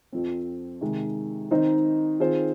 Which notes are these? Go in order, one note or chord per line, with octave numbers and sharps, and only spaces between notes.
F2 F3 C4
C3 D#3 G#3
D#3 C4 D#4 C5 D#5
D#3 C4 F4 G#4 C5